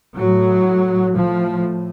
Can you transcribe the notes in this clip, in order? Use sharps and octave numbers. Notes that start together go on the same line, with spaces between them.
A2 F#3
A2 F3